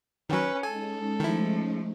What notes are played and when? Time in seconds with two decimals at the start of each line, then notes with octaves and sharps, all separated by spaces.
0.29 D#3 F#3 C#4 B4
0.63 G#3 C#4 D#4 A4 G#5
1.20 D#3 F3 A3 E4